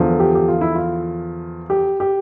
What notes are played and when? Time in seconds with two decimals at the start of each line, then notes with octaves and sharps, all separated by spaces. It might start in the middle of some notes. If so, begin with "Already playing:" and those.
Already playing: E2 D3 F3
0.20 G4
0.35 G4
0.49 F4
0.61 E4
0.75 F4
1.70 G4
2.00 G4